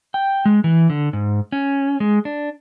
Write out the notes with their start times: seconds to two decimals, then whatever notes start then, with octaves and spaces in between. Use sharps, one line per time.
0.14 G5
0.45 G#3
0.64 E3
0.90 D3
1.13 G#2
1.52 C#4
2.00 G#3
2.25 D4